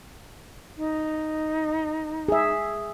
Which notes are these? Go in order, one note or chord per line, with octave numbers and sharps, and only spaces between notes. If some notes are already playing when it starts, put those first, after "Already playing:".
D#4
G#4 E5